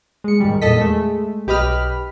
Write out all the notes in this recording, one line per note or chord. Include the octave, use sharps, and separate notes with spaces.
G#3 C#7
G#2 D#3 G3
E2 A#2 A4 D#5 B6
G#3 A3
B1 G4 B4 D#5 B5 F6